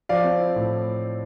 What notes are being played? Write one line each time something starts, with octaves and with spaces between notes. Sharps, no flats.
F3 D5 F5
C4
E4
A2